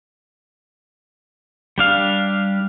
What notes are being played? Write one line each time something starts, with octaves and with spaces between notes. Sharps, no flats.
G3 D4 F5